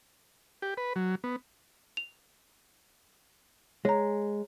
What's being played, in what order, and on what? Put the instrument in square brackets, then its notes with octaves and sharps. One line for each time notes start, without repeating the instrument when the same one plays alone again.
[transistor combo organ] G4
B4
F#3
B3
[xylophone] F7
[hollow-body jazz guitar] G#3 [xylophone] C#5 A#5